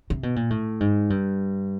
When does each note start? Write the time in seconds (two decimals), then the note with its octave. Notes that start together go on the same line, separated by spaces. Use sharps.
0.10 C3
0.23 B2
0.36 A#2
0.50 A2
0.80 G#2
1.10 G2